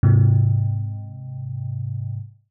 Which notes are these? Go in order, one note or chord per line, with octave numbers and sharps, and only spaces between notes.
G#2 C3